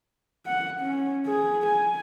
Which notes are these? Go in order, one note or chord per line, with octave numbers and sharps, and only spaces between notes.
F#5
C#4
G#4
G#5